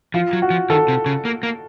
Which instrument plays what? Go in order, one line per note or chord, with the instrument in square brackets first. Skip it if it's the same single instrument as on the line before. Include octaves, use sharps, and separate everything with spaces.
[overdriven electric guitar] F3 [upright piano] F4
[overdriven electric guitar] F#3
[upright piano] F#4
[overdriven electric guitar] F3
[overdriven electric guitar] D#3 [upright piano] A4
[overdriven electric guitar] C3
C#3
A#3
A#3